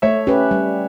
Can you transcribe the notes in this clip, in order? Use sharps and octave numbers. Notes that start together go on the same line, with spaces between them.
A3 C#5 E5
C#4 G4 B4
G3